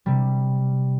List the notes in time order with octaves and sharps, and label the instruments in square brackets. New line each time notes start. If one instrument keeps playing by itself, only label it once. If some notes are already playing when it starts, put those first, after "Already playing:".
[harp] C3 G3